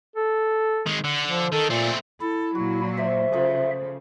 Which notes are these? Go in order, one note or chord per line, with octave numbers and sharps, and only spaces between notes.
A4
D#3 G#3
D3
F3
D#3 A4
A#2 A3 C4
E4 A4
A#2 F#3 F#4
C5 D5 E5
C#3 F3 A3 D#6